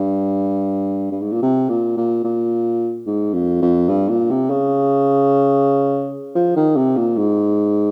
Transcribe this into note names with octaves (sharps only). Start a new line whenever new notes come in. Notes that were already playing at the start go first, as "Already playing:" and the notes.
Already playing: G2
G2
G#2
A#2
C3
A#2
A#2
A#2
G#2
F2
F2
G2
A#2
C3
C#3
F3
D#3
C3
A#2
G#2